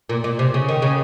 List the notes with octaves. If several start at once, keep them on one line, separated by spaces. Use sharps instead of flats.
A#2
A#2
C3
C#3
D#3
C#3